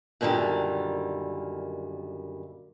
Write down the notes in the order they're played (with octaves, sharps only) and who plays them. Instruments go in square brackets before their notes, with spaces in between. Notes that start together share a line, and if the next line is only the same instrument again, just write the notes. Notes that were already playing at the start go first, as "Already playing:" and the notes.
[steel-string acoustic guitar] F#2 A#2 D3 D#3 G3